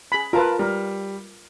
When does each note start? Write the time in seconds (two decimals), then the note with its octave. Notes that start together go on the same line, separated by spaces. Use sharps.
0.12 G#4 B5
0.33 F4 A#4 B4 A5
0.59 G3 A#4